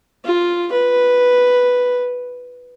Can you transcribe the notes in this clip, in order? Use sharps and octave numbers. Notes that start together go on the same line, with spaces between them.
F4
B4